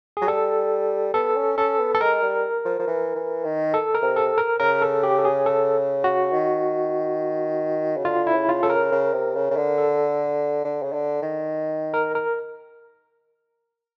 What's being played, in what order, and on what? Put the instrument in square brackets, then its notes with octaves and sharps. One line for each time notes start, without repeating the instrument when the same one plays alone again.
[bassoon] F#3 [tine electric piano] G#4
[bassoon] G3 [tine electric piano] A4
[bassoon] B3 [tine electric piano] A4
[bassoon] C#4
[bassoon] C#4 [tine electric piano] A4
[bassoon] B3
[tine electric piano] A4
[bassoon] G#3 [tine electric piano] A#4
[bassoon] G3
F3
F3
E3
E3
D#3
[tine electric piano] A4
A#4
[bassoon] C3
[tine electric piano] A4
A#4
[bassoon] C#3 [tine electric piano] A#4
[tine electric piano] A4
G4
A4
G#4
A4
F#4
[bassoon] D#3
C#3
[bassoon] D3 [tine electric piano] F4
[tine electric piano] E4
[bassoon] C#3
[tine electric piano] F4
[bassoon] C#3 [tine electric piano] A4
[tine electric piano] A#4
[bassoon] C#3
C3
C#3
C#3
D3
[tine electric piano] A4
[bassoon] D3
C#3
D3
D#3
[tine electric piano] A#4
A#4